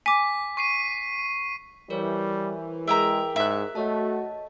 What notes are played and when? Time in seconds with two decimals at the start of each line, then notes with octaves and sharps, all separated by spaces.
0.06 G#5 D6 B6
0.57 C#6 C7 D#7
1.90 E3 G3 A#4 C5 C#5
2.87 G#3 G#4 A#4 E5 G5 A#5
3.36 G#2 E5 F#6
3.75 A3 F#4 C#5 D#5 A5